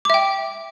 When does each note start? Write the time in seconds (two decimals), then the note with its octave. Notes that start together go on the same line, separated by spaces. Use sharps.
0.05 D6
0.10 E5
0.14 G5